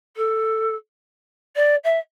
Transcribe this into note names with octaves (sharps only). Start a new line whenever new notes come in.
A4
D5
E5